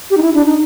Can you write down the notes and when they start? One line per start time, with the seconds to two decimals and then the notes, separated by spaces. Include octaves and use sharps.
0.11 G4
0.17 D#4
0.22 E4
0.34 D4
0.46 D#4